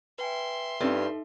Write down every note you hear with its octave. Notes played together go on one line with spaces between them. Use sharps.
B4 E5 G5 G#5 C6
G2 G3 C4 C#4 D#4 A4